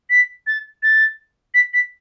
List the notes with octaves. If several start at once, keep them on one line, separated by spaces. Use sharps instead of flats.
B6
A6
A6
B6
B6